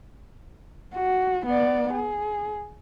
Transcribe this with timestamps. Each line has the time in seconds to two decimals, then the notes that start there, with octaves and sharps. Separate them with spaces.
0.95 F#4
1.46 B3 D5
1.93 G#4